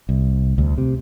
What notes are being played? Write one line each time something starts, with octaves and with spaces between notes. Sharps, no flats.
C2
D2
C3